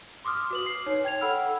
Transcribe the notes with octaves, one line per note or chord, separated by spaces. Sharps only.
C6 D6 D#6 F6
F#4 B4 F#7
C7
D#4 C#5
G5 G#6 F7
A4 F#5 B5 E6 F6